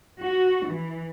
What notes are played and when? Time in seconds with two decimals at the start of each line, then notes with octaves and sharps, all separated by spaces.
0.20 F#4
0.68 E3